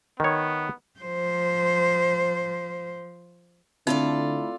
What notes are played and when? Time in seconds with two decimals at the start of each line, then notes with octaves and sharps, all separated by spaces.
0.20 D#3 B3 C#5
1.00 F3 C5
3.87 D3 A3 C4 E4 F4 A4 D5